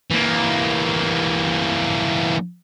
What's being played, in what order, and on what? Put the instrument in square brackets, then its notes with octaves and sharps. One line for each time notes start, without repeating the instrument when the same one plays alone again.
[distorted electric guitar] E3 A#3